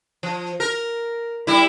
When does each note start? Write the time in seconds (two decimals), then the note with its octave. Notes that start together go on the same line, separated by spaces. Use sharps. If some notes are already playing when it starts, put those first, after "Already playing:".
0.23 F3
0.60 A#4
1.47 G3 E4